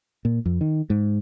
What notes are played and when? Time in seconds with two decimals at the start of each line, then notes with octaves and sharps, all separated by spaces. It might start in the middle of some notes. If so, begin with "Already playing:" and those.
0.25 A#2
0.46 F2
0.61 D#3
0.90 G#2